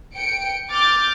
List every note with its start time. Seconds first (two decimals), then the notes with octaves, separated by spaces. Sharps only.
0.16 G5 C#7 D7
0.70 D6 F6 G6 A6 D7